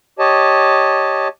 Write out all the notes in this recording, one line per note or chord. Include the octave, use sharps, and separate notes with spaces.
G4 C#5 D#5 A5